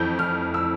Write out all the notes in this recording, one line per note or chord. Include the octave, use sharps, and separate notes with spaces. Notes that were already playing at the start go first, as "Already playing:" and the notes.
Already playing: F2 E3 G6
F6
E6